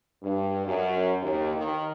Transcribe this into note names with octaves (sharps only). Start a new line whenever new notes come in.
G2
F#2
D#2
D#3